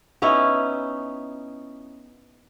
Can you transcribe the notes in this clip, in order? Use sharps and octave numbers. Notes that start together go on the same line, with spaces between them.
B3 C#4 D#4 E4